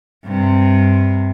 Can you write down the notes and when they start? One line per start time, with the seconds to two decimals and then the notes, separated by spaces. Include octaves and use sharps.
0.24 G2 C3